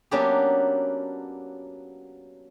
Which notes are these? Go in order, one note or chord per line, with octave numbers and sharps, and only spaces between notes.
F#3 A#3 B3 C#4 D4 G4